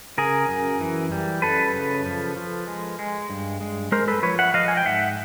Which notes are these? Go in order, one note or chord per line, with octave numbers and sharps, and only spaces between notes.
C#3 G#4 A#4
F#2
E3
G3
F#2 A4 B4
C#3
F3
F3
G#3
G#3
G2
G#3
G#3 A#4 C5
A4 B4
F3 B4 C#5
E5 F#5
F3 D#5 F5
G#5
G5
G#2 E5 F#5